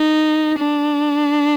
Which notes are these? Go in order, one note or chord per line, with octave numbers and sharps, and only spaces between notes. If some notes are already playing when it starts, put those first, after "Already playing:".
Already playing: D#4
D4